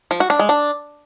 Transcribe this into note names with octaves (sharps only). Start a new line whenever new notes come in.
F3
F#4
D4
G#3
D4